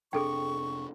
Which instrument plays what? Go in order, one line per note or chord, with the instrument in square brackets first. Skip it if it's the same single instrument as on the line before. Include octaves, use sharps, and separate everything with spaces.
[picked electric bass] F1 C3 D4 [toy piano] G#4 A4 G5 [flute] C#6